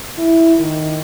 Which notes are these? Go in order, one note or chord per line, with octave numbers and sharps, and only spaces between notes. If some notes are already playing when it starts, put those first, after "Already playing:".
E4
D#3